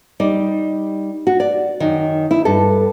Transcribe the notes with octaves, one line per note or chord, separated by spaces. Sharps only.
G3 D#4 D5
F#4
D5
F#2 D#3
E4
G2 A4